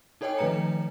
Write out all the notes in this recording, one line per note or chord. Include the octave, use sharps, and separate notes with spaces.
D#4 A4 C#5 D#5 G5 G#5
D#3 F3 A3 B4 A#5 C#7